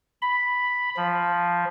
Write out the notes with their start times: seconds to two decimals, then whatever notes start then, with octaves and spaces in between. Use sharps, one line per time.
0.22 B5
0.97 F3